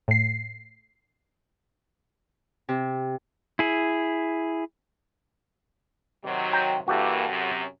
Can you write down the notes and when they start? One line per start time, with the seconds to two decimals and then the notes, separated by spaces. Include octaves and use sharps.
0.08 A2 C7
2.69 C3
3.59 E4 G#4
6.24 C3 D#3 F#3
6.53 G5 A#5
6.88 G2 E3 A#3 F#4 G4 A4
7.29 F#2 C3 F#3